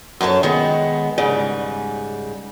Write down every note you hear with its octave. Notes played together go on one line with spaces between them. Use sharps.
F#2 A4 C#5 A5
D#3 G#3 B3
G#2 C#3 G3